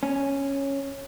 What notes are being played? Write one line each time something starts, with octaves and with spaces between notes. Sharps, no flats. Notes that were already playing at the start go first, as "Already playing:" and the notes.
C#4